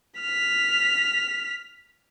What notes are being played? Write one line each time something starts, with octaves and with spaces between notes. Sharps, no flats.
F6 B6